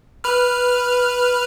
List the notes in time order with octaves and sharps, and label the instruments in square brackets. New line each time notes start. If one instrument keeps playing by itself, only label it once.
[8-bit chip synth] B4 F6